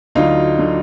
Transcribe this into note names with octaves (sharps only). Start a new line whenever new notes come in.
D2 D3 F#3 D#4 F4
D3 F#3